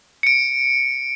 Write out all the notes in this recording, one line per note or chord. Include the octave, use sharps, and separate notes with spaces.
C#7 D7